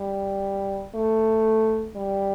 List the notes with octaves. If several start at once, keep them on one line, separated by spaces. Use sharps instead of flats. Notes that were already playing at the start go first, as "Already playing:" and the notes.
Already playing: G3
A3
G3